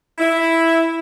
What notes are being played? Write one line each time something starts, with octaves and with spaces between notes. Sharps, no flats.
E4